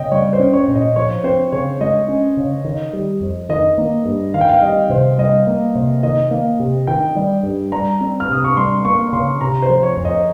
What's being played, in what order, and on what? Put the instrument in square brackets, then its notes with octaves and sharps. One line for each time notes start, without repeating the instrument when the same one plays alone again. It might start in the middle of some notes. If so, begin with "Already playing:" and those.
Already playing: [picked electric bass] C#3 [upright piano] D#5 G5
[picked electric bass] G3 [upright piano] C#5
[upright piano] C5
[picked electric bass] C#4
[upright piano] C#5
[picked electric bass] A#2
[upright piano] D#5
[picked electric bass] F3 [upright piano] C#5
[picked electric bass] C4 [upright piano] C5
[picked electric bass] C#3 [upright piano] C#5
[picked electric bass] G#3 [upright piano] D#5
[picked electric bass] C#4
C#3
D#3
G3
F2
[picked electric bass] D#3 [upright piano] D#5
[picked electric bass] A#3
G2
[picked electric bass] D#3 [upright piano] F5
[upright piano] G5
F5
[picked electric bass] G3 [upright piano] D#5
[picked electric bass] C3 [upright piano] C5
[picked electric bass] G3 [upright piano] D#5
[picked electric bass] A#3
C3
[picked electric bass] D#3 [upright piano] D#5
[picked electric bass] A#3
C3
[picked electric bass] D#3 [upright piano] G5
[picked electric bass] G3
G2
[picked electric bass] G3 [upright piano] A#5
[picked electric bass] C4
[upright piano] F6
[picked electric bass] C3 [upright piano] D#6
[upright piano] C#6
[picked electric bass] G3 [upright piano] C6
[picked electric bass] A#3 [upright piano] C#6
[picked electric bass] C#3 [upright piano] C6
[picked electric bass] C3 [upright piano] A#5
[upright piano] C5
[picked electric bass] F3
[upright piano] C#5
[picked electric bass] F2
[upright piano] D#5